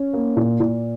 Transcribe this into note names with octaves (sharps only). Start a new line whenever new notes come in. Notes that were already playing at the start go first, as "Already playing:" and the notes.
Already playing: C#4
A#3
A#2
A#2